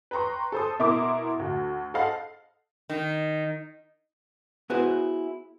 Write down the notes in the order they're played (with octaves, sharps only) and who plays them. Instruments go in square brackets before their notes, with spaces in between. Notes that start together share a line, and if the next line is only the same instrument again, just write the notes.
[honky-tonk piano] B4 G5 A#5 C6 C#6
A4 C5 D#6
B2 E4 A#4 C6 D6 D#6
D2 F#4
A4 C5 D#5 F5 F#5
[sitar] D#3
[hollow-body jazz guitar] B3 E4 F#4 G#4 B4 C5